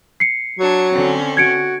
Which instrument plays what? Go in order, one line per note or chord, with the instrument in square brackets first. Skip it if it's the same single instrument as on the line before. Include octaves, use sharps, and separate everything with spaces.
[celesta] C7 C#7
[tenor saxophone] F#3 [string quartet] D4 G#6
[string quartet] D3 C4 C#4
[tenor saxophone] F#4 [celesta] G#6 C#7 D7